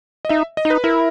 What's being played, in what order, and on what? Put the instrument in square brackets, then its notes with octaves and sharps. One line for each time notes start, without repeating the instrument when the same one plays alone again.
[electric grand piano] D#5
[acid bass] D#4 [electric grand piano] E5
[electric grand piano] D#5
[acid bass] D#4
[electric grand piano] B4
[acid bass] E4 [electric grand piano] A#4